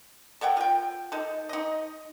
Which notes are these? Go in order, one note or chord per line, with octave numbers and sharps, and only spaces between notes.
A4 C#5 F#5 G5
F4 G5
D#4 A4
D#4 D#5